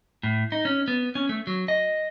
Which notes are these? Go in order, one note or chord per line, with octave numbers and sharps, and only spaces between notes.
A2
D#4
C#4
B3
C#4
A3
F#3
D#5